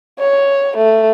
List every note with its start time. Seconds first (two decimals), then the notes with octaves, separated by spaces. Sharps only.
0.19 C#5
0.77 A3